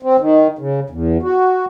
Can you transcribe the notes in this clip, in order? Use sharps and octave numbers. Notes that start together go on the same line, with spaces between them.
C4
D#3
C#3
E2
F#4